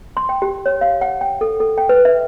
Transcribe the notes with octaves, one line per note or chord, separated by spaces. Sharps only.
C6
G5
G4
C#5
F5
F#5
G5
A4
A4
G5
B4
E5